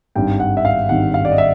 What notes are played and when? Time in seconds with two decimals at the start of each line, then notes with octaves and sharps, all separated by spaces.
0.15 G#1 G2 D#3 G5
0.40 F#5
0.57 E5
0.65 F5
0.89 G#1 G2 D#3 F#5
1.14 F5
1.25 D5
1.32 D#5
1.38 E5